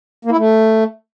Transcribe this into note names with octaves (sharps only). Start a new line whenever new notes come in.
A#3
E4
A3